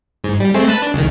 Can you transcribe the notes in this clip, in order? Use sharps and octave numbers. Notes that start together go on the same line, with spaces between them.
G#2
G3
G#3 A3 C4
B4 A5 B5
D4
C#2 D#3